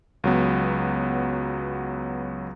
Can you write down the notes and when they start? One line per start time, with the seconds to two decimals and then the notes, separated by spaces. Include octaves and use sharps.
0.24 C#2 F#3 B3